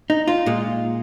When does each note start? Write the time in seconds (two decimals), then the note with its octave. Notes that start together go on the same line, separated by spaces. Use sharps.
0.10 D#4
0.28 F4
0.46 A#2 G#3